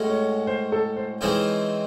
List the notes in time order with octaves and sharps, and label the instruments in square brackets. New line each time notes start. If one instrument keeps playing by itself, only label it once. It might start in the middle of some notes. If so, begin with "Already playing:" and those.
Already playing: [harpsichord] A2 G#3 C#4 F#4
[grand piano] C#5
C5
A4
C5
[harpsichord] C#3 E3 G#3 C4 D#4